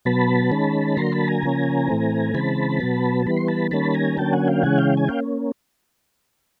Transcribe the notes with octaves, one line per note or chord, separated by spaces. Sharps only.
B2 F#3 B3 A5 B5
D#3 G#3 C#4
D3 F#3 A#3 A#5 C6
A5 B5
G#5 A#5
C#3 F3 A#3 C#4
A2 E3 A3 C4
C#3 E3 G#3 C4 A5 B5
B2 F#3 B3
E3 G3 B3 B5
C6
A5 B5
D#3 G3 A#3 C#4 A5 B5
G#5 A#5
D3 F#3 A#3 C#4 G5 A5
F#5 G#5
F5 G5
C#3 E3 G#3 C#4 F#5 G#5
F5 G5
G#5
A#3 C#4 F5 G5